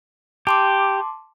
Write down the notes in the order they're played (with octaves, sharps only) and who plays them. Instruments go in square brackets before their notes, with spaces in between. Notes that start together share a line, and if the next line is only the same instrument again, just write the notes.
[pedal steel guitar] G4 [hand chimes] A5 C6 D6